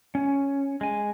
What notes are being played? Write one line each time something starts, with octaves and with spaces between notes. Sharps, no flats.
C#4
G#3 G#5